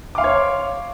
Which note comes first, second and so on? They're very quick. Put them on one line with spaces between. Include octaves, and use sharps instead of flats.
D6 F5 C6 C#5